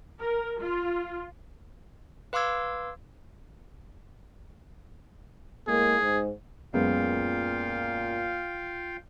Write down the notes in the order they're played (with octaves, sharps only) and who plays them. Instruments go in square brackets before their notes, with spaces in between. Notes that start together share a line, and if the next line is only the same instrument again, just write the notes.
[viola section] A#4
F4
[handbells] B4 F5 C6 D6 E6 G#6
[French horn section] A2 G#3 A#3 [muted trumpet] G#4
[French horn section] G#2
[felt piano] F#2 G#3 B3 [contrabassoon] A#2 [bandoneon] F4 F5 G5